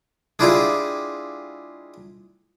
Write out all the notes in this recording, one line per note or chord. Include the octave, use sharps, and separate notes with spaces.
G#3 D4 E4 F4 G4 G#4